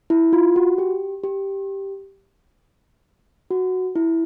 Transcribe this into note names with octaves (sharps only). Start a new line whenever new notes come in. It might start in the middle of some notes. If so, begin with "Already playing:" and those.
E4
F4
F#4
G4
G4
F#4
E4